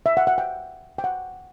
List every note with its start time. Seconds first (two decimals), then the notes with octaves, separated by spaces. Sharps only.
0.06 E5
0.17 F#5
0.27 F#5
0.38 G5
0.98 G5
1.04 F#5